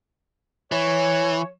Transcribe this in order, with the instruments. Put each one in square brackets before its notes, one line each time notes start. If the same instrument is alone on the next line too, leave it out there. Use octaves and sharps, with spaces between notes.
[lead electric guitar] E3 [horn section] C#5